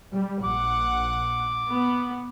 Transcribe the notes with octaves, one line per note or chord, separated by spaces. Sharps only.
G3
A#1 F#5 D6
B3